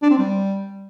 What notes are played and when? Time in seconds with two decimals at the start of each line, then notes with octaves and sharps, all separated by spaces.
0.02 D4
0.10 C4
0.18 G3